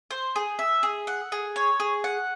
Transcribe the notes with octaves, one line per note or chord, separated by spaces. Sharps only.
C5
G#4
E5
G#4
F#5
G#4
C#5
G#4
F#5